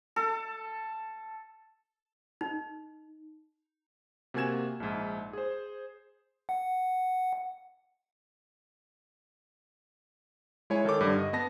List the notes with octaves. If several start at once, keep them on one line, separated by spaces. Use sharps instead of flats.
A4
D#4
C3 A#3 F#4 G#5 G#6 E7
A#1 G#2
G#4 C5
F#5
G#3 E4 C#5 G#5
D#3 A4 C#5 D6
G2 D3
D#5
B3 A5 A#6